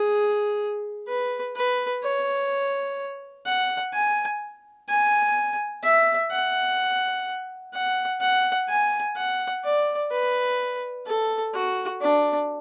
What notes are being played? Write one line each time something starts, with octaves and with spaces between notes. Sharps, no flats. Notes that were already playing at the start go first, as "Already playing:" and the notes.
Already playing: G#4
B4
B4
C#5
F#5
G#5
G#5
E5
F#5
F#5
F#5
G#5
F#5
D5
B4
A4
F#4
D4